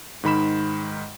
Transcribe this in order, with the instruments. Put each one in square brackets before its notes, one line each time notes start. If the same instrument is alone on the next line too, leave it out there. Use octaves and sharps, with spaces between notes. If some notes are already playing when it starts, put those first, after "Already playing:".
[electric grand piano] G#2 D#3 B5 E7